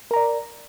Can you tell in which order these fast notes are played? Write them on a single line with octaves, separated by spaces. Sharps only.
A#4 A#5 D5